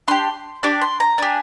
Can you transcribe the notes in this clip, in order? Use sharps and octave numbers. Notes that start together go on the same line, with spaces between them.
D4 G4 C6
D4 G4 D6
C6
A#5
D4 G4 G#5